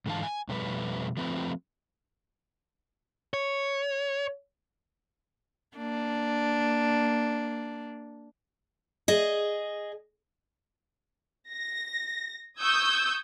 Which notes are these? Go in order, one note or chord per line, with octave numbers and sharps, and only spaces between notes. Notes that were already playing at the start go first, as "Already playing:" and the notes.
G#2 D3 E3 A3 F5 A5
G#5
F2 B2 G3 A3 B4
F3 A3 C4 B4
C#5
A#3 D4
G#4 D#5
A#6
C#6 D#6 E6 G6 G#6